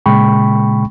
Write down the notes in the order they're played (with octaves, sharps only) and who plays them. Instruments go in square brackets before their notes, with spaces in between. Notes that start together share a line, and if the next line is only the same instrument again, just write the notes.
[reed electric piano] A#2 C#3 G#3 G5 B5 C#6